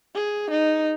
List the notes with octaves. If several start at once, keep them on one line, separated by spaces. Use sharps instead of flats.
G#4
D#4